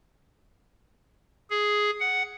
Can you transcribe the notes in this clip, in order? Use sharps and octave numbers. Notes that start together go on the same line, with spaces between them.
G#4
F#5